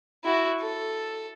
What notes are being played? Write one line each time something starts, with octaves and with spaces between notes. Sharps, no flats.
E4 F#4
A4